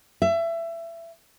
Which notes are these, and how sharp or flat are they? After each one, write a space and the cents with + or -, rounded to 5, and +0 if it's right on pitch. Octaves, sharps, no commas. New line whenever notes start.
E5 +25